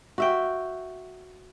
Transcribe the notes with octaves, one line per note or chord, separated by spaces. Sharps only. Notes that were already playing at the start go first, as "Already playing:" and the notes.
F#4 E5 G5